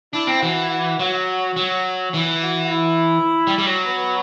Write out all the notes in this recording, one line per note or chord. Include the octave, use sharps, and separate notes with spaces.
D4 E4
C4
E3 F#4
F#4
F#3 F#4
F#3
E3
F#4
F#4
E4
G3
G3
F#3
B3